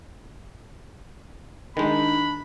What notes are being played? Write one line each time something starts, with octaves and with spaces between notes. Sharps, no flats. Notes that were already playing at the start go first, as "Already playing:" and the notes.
D#3 G#3 D4 D#4 B5